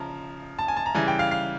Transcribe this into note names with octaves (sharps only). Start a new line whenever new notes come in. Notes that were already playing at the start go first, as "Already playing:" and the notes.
Already playing: C#3 F3 A5 A#5
A5
G#5
A5
A#5
C#3 E3 G3 G#5
G5
F5
F5